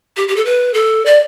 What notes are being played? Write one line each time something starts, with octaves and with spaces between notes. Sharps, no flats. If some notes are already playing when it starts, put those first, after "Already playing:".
G4
G4
A4
B4
A4
D5